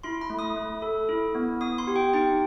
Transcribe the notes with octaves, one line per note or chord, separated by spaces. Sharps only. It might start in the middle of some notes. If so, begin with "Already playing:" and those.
E4 C6
B5
A3
D#6
A3
A4
E4
B3
B3 D#6
C6
G4
G5
D#4 G5